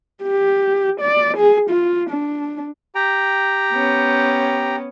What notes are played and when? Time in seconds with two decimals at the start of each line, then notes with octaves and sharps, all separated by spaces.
0.23 G4
1.00 D5
1.37 G#4
1.70 F4
2.10 D4
2.95 G4 G5 A#5
3.72 B3 C#4